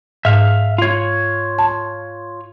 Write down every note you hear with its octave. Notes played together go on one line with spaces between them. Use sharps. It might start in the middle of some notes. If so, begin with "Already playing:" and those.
G#2 E5 F5
F4 C#5
A5